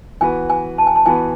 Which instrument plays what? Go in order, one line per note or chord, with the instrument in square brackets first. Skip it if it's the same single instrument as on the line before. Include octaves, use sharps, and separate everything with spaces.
[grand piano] E3 B3 F#4 B4 [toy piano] G#5
[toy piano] G#5
A5
G#5
A5
[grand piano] E3 B3 F#4 B4 [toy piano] G#5